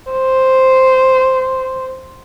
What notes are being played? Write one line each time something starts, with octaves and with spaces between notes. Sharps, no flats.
C5